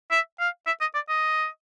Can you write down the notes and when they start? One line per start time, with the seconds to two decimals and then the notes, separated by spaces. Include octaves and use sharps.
0.11 E5
0.40 F5
0.67 E5
0.81 D#5
0.95 D5
1.09 D#5